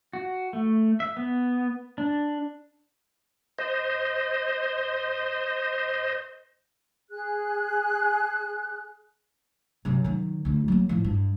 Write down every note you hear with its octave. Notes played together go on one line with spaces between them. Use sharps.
F#4
A3
E5
B3
D4
C5 D#5
G#4 F#6
F#2 C3
D#3 F#3
D2 D3
F#3 A#3
A2 F3
G2